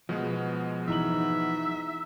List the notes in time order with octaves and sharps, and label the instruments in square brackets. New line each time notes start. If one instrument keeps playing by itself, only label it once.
[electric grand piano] B2 G#3 B3 [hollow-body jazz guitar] F3
[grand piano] E3 D#4 F#7 [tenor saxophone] E5